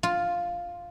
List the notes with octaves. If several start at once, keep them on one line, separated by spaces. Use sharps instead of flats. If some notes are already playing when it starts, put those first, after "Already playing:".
F4